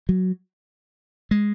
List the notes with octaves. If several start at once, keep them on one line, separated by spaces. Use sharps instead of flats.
F#3
G#3